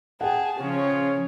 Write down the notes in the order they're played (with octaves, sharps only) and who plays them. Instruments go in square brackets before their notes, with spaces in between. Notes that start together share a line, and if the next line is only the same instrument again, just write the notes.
[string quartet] G#4 A5 [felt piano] F#5 G5
[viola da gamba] C#3 F3 [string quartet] C#4 [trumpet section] F4 G#4 C#5